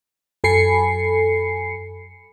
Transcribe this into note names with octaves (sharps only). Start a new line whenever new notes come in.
F#2 A4 G#5 B5 C7 C#7